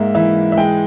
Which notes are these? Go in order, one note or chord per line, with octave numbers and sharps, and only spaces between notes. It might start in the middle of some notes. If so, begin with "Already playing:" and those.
Already playing: G#2 A#3 E5
E3 E5
E5
G#3 G5